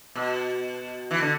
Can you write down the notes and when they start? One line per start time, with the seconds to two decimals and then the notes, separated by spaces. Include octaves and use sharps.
0.15 B2
1.11 E3
1.21 D3